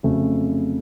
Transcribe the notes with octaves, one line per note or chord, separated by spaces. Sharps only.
F1 F2 C#3 F#3 A3